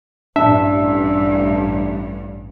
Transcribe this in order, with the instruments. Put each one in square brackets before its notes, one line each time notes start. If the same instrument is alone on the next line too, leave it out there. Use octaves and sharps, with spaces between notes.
[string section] A1 G2 [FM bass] D4 [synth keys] E5